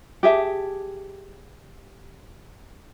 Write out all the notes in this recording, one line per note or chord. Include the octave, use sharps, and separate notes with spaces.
G4 G#4 E5 A5